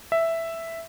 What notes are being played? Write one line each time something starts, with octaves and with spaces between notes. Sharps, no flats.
E5